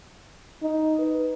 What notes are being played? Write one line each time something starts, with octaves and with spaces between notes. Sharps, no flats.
D#4
B4